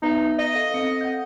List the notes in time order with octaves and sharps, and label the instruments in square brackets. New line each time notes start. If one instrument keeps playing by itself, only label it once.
[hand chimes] B3 B4 E5 [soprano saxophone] D#4
[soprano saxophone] D#5
[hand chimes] A4 F5
C4 C#7
F#5 G6